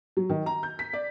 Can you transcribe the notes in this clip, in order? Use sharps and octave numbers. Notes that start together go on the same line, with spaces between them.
F#3
D#3
A#5
G6
B6
D5